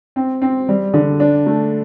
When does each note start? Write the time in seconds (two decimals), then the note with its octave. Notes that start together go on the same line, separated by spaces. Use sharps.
0.16 C4
0.42 C4
0.69 G3
0.94 D3
1.20 D4
1.46 A3